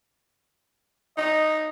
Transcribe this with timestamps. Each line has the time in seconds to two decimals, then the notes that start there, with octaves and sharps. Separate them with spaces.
1.18 D#4 D#5